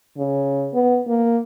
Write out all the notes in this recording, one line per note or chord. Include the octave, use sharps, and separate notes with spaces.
C#3
B3
A#3